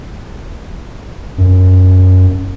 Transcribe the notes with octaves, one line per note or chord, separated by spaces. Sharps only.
F#2